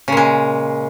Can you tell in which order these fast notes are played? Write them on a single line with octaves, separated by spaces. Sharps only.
C#3 A#2 G#3